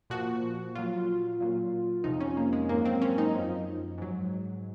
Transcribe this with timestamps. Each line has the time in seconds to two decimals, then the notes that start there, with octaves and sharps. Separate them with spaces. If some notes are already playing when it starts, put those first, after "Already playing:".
0.10 A#2 F3 F#4
0.75 A#2 F#3 F4
1.40 A#2 F#3
2.04 F2 C3 F3 D#4
2.20 C#4
2.37 A#3
2.53 G#3
2.69 G#2 F#3 A#3
2.85 C4
3.02 C#4
3.18 D#4
3.34 F#2 F3
3.98 G#2 F#3